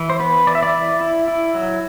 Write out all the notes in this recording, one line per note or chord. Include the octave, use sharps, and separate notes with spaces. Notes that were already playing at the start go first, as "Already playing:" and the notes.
Already playing: E3
C5
B3 B4
E3 D5
E5
D5
E4
E4
E4
F#3